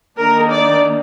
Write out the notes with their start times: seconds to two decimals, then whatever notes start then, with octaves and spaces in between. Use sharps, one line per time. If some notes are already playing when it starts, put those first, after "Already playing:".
0.17 D#3 A#3 D4 A#4
0.50 D5